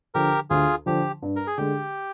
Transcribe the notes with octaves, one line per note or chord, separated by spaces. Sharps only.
D3 F3 G4 A#4
D2 F4 G#4
D3 F3 G4
G2
A#4
G#4
D3 G#3 G4